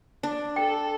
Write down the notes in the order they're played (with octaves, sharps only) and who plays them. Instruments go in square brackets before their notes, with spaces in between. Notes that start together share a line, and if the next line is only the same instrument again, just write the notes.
[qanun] D4
[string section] A4 [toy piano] G5